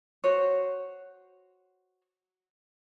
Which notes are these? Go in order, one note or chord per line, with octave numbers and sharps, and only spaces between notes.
F#4 C5 C#5